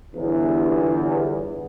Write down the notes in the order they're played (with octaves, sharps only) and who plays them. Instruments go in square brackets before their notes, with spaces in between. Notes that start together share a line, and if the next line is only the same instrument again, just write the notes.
[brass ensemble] G1 E2